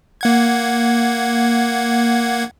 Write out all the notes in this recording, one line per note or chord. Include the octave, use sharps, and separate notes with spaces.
A#3 F#5 G#6